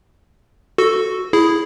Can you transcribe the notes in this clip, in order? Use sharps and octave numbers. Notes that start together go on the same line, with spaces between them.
F#4 A4
E4 G#4